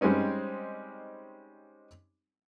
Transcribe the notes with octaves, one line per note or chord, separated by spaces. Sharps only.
G3 G#3 C4 C#4 D#4